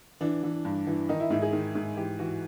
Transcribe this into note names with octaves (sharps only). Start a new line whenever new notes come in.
E3 D4
E3
G2
E3
D#3 D#4
E4
G#2 E4
G#4
D#3
G#2
E3 G4
E3 F#4